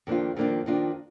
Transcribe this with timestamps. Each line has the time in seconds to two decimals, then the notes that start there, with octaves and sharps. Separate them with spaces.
0.07 F2 D#3 A#3 D4 F4
0.37 F2 D#3 A#3 D4 F4
0.66 F2 D#3 A#3 D4 F4